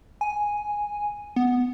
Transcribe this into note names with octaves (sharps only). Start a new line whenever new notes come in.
G#5
B3